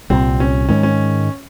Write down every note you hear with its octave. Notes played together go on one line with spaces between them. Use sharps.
C2 A#2 G3 C4
C#4
G#2 D#3 G#3 C#4
C#4